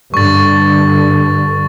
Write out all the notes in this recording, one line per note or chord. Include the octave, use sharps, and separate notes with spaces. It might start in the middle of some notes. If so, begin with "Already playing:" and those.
G2 D3 C#6 A6